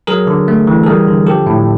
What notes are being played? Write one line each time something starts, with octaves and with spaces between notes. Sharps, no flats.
F#3 G#4 A#4
D3
A3
E3
A4
G3 G#4 A#4
D3
F3 G4 A4
A2